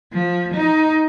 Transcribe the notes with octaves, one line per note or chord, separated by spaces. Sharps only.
F3
D#4